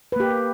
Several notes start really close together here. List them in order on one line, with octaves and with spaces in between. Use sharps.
B4 A#3 G4